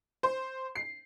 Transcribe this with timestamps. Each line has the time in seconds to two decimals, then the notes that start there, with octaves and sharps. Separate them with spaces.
0.23 C5
0.75 C7